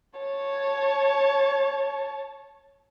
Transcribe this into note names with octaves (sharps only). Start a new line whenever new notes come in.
C#5 A5